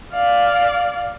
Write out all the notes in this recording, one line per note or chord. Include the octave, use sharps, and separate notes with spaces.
D5 F5